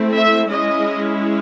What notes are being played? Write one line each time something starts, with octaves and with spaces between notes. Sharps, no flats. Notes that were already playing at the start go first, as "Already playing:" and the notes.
Already playing: A3 C4 E4
E5
G#3 C#4 E4 D#5